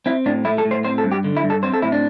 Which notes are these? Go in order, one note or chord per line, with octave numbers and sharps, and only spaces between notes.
C4 E4
A2 D4
A3 E4
A4
A2
C5
C4 C5
A4
G2
G4
D3
E4
G2
A4
C4 C5
A4
A2 E4
D4